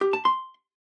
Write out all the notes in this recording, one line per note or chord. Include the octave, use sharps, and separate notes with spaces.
G4
A5
C6